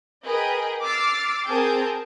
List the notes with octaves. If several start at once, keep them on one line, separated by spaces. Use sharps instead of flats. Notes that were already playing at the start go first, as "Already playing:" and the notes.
G#4 A#4 B4 D#5 G5
D6 E6 F6 A6 C7
C4 G#4 A#4 G5 A5